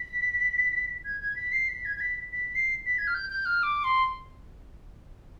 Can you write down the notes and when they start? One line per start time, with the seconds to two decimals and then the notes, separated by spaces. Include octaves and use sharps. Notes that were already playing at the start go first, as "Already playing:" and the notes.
Already playing: B6
1.05 G#6
1.21 G#6
1.36 B6
1.52 C7
1.69 B6
1.85 G#6
1.96 G#6
2.00 B6
2.33 B6
2.55 C7
2.86 B6
2.98 G#6
3.07 F6
3.14 G6
3.30 G6
3.46 F6
3.63 D6
3.84 C6